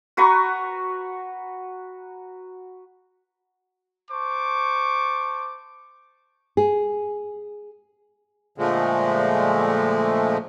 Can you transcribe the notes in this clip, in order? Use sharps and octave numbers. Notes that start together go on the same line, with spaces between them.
F#4 B4 A#5 C#6
C5 A5 C#6 D6
G#4
A#2 D3 F3 G#3 A3